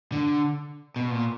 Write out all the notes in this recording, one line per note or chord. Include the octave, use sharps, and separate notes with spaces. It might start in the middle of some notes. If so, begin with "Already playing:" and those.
D3
B2
A#2